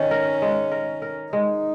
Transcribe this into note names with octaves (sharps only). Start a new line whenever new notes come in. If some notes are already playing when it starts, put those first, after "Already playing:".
Already playing: D#3 C#4
A#4
G#3
A#4
A#4
G#3 D#4